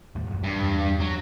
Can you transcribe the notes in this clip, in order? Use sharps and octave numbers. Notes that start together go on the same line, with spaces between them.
D#2 A2 G3
A1 F#2
G2
E2
F#3